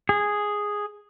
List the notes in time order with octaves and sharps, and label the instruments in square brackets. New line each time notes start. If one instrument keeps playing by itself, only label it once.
[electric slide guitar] G#4